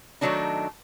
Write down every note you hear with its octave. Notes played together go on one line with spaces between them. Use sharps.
D#3 E3 F#3 A3 D4 D#4